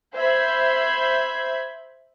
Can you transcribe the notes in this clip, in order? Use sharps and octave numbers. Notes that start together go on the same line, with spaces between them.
C5 E5 B5 G6 G#6